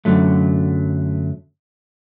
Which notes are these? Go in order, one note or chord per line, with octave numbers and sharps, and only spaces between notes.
F#2 A#2 D3 F#3 A3